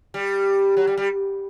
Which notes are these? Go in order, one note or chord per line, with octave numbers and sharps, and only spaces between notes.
G3
F#3
G3
G3